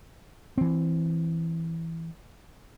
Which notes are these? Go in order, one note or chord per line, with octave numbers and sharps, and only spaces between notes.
E3 C4